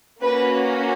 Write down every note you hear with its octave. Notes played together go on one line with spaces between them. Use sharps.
A#3 C#4 F#4 B4